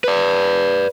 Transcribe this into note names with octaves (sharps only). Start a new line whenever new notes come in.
B4 D5